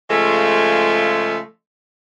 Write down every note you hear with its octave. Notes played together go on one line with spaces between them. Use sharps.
C#3 F3 G#3 A3